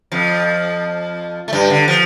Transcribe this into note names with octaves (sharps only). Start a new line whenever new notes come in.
F2 F3
A3
G2 G3
D3
F3